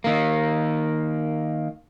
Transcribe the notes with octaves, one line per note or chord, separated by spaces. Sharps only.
D#3 A#3